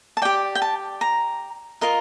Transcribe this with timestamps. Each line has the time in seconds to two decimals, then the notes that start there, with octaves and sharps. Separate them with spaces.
0.17 A5
0.22 G4 D5 G5
0.55 G5
0.62 A5
1.01 A#5
1.81 F4 A#4 D#5